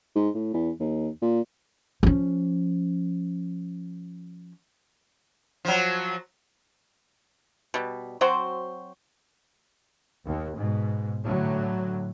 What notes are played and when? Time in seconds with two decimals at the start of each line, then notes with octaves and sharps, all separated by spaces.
0.16 G#2
0.34 A2
0.54 E2
0.80 D#2
1.22 A#2
2.03 F3 C#4
5.65 F3 F#3
7.74 B2 G3
8.21 F#3 C4 F#4 C5
10.26 D#2
10.58 G#2 B2
11.23 A2 D3 F#3